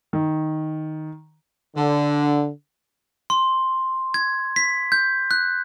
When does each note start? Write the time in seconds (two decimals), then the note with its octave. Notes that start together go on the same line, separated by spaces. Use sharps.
0.13 D#3
1.76 D3
3.30 C6
4.14 G#6
4.56 B6
4.92 G6
5.31 F#6